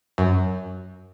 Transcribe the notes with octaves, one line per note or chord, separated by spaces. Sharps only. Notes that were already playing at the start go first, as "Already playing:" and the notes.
F#2